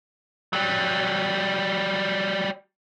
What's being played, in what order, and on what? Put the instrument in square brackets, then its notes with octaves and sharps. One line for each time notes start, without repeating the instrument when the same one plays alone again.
[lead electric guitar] F#3 G3